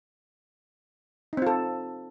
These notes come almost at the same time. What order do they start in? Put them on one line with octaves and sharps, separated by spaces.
D#4 C4 F4 A4